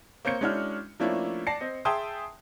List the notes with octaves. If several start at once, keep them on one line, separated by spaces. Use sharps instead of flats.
A#3 C4 C#5 G6 C#7
G#3 C#4 D4 E4 F#4 F6
F3 A3 A#3 C#4 D4 E4
D5 A5 A#6 C7 C#7
C4 D#5
G#4 E5 G5 A5 C6 D#6